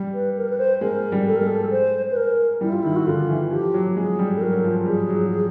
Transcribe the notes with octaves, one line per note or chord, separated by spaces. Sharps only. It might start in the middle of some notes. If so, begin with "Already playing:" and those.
Already playing: G3
B4
A#4
B4
C5
G#3 A#4
G3
A4
A#4
G#3
A4
C5
B4
A#4
G3 E4
F4
D#3 E4
F#4
D3 F4
E3
F3 G4
F#3
G#3 G#4
G3
A4
F#3 A#4
F#3
F3
G3 G#4
F#3